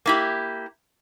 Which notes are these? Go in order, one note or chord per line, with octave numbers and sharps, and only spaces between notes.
A#3 E4 G4